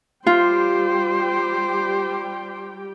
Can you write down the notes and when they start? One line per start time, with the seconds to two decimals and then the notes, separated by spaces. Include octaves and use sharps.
0.26 G3 F4 G4 C5 G5